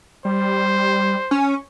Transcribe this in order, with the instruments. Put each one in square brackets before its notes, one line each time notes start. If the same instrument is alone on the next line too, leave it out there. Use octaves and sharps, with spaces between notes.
[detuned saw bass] G3 [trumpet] C5
[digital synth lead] C#4